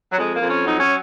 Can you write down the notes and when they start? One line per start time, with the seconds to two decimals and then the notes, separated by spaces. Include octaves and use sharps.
0.12 F#3
0.18 F2 G#3
0.34 A#3
0.42 F2
0.49 C#4
0.65 F#3 D#4
0.80 C#4